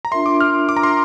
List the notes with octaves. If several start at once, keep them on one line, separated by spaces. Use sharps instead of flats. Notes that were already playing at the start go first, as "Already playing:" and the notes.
A#5
D4 F4 A#4 E5 C6
D6
F6
D6
A#5
C6